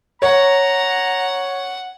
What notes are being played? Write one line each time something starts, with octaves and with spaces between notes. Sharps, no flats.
C#5 F#5 A#5